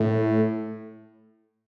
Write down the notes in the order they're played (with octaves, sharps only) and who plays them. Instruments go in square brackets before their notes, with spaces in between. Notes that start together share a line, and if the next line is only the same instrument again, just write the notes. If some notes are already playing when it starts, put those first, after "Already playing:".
Already playing: [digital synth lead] A2